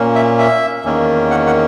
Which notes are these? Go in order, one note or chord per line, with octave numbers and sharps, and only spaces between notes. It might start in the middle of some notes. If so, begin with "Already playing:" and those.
Already playing: A#2 A#3 C#4
E5
E5
E2 D#3 A#3 C#4
F#5
F#5